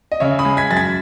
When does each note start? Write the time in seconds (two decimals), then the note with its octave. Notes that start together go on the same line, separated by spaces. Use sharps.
0.12 D#5
0.20 C#3 C#5 E5
0.39 B5 D#6
0.45 G#3
0.57 G#6 B6
0.71 F#2 A6
0.77 G#6 B6